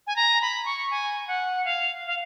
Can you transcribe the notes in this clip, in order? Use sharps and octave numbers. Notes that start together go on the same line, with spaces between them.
G#5
A#5
B5
C#6
G#5
F#5
F5
F5